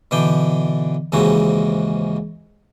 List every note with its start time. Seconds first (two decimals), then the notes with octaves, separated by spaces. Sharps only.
0.11 B2 D3 E3 D4 G5
1.12 D#2 G#2 C#3 E3 C4 F#4